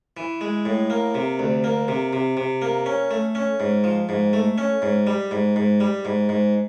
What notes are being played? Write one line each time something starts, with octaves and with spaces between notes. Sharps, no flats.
E3
G#3
A2
A#3
C3
D2
A#3
C3
C3
C3
A#3
C#4
A3
C#4
G#2
F3
G#2
A3
C#4
G#2
G3
G#2
G#2
G3
G#2
G#2